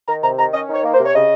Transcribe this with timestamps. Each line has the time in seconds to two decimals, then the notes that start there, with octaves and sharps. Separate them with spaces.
0.08 D#3 A#5
0.23 C3 A#5
0.38 D#3 A#5
0.53 C#4 D#5
0.69 D#3
0.74 C#5
0.84 A#3
0.94 C5
0.99 C3
1.06 C#5
1.14 C#3 D#5